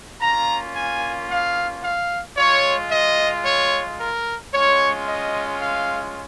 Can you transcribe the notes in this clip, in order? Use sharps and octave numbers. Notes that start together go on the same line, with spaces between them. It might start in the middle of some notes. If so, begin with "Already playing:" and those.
A#3 C#4 F4 A#5
G#5
F5
F5
G#3 F4 C#5
D#5
C#5
A#4
G#3 C#4 F4 C#5
D#5
F5